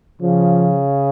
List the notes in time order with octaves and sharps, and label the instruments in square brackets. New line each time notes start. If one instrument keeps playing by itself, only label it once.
[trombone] C#3 [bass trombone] F3